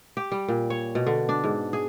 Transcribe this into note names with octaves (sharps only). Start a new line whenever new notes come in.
G4
G3
A#2
C#5
B2
D3
D4
G#2
G#4